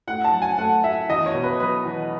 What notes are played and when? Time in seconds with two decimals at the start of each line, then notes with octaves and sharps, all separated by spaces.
0.07 A2 F#5
0.24 A5
0.32 F#3
0.42 G#5
0.58 A3 F#5
0.84 A2 E5
1.09 E2 D#5
1.26 C#5
1.35 B2
1.43 B4
1.60 F#3 B4
1.85 E2